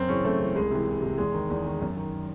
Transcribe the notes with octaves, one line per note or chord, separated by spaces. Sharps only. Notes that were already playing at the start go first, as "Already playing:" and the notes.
Already playing: F#2 C4
C#3 E3 C#4
F#2 A3
C#3 E3
C2 G#3
C3 E3
C2
C3 E3
E2 G#3
D#3
E2
D#3
F#2
D#3